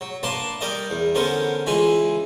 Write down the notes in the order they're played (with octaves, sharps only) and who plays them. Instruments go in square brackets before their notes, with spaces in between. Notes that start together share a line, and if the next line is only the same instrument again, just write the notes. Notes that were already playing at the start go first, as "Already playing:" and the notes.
[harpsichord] F#3
A#3 D4 B4 A5 C6
G3 A#4 D5 D#5
E2
D3 B3 C#4 A#4 C5
C#2 E3 G#3 G#5 B5